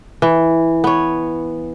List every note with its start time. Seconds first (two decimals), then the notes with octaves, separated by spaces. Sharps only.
0.22 E3
0.84 B3 C#5